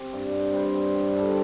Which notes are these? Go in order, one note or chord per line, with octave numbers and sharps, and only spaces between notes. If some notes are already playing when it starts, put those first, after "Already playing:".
Already playing: C4 G4
G2
C4
G3 C5
C4
G2
G3 A4